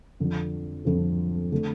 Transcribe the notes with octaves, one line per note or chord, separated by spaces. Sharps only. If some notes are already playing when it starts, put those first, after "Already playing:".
F2 D3 F3
F2 D3 F3
D3 A3